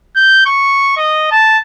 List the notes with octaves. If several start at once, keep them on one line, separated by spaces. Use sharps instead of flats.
G6
C#6
D#5
A5